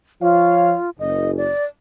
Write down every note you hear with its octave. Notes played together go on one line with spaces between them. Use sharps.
F3 F4 C#5 F5
F#1 D#5
D5